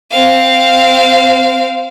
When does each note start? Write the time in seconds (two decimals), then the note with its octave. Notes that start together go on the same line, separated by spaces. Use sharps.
0.11 C4 F5